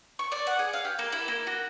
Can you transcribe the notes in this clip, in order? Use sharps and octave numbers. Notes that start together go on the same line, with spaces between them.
C#6
D5
F#5
G#4
F5
G4
A#3
E4
A#3
F#4